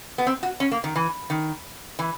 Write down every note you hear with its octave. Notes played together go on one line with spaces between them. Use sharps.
B3
C4
F#4
C#4
A#3
D#3
E3
D#3
E3